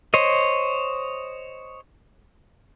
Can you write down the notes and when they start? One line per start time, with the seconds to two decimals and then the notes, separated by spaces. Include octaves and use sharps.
0.14 C5 C#5 D#5